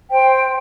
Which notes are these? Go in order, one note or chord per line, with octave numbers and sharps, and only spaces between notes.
C5 G5